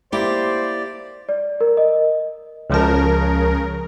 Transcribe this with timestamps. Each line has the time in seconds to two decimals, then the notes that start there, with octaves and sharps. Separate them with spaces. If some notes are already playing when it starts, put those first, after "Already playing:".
0.13 A#3 E4 G4 C5 D5
1.29 D5
1.61 A#4
1.77 D#5
2.70 C#2 C#3 F3 A#4 A5